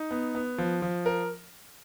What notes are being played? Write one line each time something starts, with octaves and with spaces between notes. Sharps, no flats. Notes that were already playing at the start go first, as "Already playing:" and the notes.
Already playing: D#4
B3
B3
F3
F3
A#4